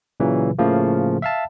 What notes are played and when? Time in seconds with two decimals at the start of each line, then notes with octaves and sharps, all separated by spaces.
0.20 A#2 C#3 E3 F#3
0.58 A2 C#3 F3 A3 A#3
1.22 E5 F5 A5